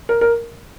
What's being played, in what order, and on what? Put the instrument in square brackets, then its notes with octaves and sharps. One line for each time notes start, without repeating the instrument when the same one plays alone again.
[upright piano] A#4
A#4